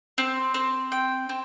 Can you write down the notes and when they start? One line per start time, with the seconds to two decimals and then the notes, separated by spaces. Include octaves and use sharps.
0.18 C4
0.54 C4
0.92 G5
1.29 C4